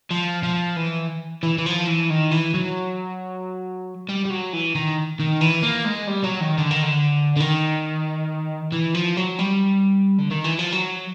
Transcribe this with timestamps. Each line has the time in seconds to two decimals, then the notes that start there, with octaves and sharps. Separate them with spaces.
0.11 F3
0.43 F3
0.76 E3
1.43 E3
1.58 E3
1.66 F3
1.87 E3
2.10 D#3
2.31 E3
2.54 F#3
4.09 G3
4.25 G3
4.30 F#3
4.53 E3
4.75 D#3
5.20 D#3
5.41 E3
5.63 A#3
5.85 G#3
6.08 G3
6.24 F#3
6.41 D#3
6.58 D3
6.71 D#3
6.83 D3
7.36 D3
7.40 D#3
8.72 E3
8.95 F3
9.17 F#3
9.39 G3
10.18 D3
10.31 D#3
10.44 E3
10.59 F3
10.72 F#3